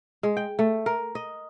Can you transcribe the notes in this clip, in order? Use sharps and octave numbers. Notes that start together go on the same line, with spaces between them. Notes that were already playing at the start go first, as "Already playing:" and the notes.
G#3
G5
A3
A#4
D#5